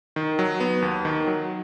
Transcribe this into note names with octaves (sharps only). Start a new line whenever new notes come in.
D#3
F#3
B3
D#2
D#3
F#3